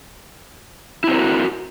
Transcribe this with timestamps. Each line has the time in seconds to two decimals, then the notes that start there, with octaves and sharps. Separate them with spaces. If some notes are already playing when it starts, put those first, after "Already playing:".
1.04 E4
1.07 C4
1.11 C5
1.14 A#4
1.18 F#4